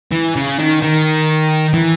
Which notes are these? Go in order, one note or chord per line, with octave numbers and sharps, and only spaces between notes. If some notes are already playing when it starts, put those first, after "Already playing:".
E3
C#3
D#3
D#3
E3